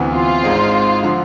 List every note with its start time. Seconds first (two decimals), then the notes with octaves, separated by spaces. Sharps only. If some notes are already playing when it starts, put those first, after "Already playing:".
Already playing: D2 C3 E3 B3
0.14 F4
0.43 G#1 G#2 G#3 C4
1.03 D3 F3